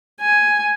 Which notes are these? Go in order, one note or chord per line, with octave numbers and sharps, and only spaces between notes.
G#5